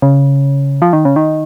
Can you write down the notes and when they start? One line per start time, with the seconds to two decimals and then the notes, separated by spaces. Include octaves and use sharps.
0.02 C#3
0.82 F3
0.93 D#3
1.05 C#3
1.16 D#3